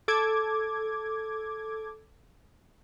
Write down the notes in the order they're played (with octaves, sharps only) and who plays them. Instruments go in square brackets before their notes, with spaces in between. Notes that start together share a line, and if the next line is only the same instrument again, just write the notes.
[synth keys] A4 D6 G#6